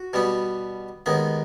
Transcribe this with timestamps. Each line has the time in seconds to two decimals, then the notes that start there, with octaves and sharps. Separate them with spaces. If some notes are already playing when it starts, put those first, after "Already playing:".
Already playing: F#4
0.13 B2 G3 B3
1.06 D#2 D#3 G#3 B3